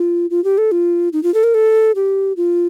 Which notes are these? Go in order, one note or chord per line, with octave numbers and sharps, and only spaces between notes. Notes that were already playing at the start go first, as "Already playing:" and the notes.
Already playing: F4
F4
G4
A4
F4
D#4
F4
A4
A#4
A4
G4
F4